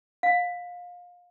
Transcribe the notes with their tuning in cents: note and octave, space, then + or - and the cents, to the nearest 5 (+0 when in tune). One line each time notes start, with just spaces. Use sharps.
F5 +25